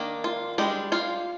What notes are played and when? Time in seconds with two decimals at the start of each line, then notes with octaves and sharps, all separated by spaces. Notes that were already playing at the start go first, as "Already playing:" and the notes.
Already playing: D#3 A#3 D4
0.24 F4
0.58 G3 G#3 D4 G4
0.92 F4 F5